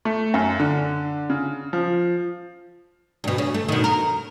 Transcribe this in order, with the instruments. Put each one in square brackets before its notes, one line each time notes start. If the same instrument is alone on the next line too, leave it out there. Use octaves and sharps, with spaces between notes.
[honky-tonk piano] A3
F#2
D3
C#3
F3
[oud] D2 B2
C#3
A3
B2 D#3
A#4